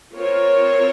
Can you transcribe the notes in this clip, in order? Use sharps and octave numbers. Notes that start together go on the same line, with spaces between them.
C4 F4 A#4 C#5